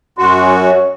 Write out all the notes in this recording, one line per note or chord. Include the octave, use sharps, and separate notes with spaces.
F#2 F#4 C6
C#5